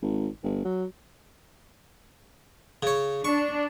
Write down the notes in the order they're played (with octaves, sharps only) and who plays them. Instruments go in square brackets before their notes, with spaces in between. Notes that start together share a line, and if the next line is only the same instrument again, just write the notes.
[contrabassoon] G#1
G1
F#3
[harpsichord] C#3 C#5
[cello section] D4 [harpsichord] C#6